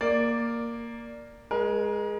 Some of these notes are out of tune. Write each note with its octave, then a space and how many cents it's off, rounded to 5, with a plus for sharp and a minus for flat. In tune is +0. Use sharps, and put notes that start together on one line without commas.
A#3 +0 D5 +0
G#3 +0 A#4 +35